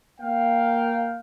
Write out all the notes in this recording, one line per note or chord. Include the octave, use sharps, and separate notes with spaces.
A#3 F5 G5